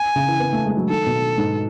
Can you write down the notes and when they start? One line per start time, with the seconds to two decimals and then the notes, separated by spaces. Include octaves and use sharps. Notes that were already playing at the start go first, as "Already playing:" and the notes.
Already playing: G#5
0.16 C#3
0.28 E3
0.40 B3
0.53 A3
0.66 G#3
0.77 F#3
0.89 D#3 A4
1.06 B2
1.38 G#2